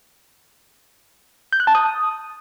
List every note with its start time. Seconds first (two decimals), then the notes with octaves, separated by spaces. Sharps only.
1.53 G6
1.60 F#6
1.67 A5
1.75 D#6